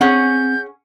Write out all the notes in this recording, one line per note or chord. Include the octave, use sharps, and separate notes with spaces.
C4 C#4 G#4 F#5 G6